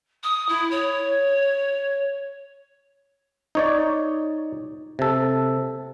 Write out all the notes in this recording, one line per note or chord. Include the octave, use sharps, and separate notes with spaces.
D#6
E4
C#5
D#4 C#5 D5
C3 A4